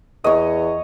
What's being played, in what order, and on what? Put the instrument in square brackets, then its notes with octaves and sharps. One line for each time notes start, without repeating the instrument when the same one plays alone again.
[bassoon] E2 [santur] C#5 D#5